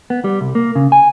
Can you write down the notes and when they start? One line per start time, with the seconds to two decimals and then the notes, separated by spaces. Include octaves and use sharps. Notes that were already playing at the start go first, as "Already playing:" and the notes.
0.10 B3
0.24 G3
0.41 C2
0.55 A#3
0.75 C#3
0.92 G#5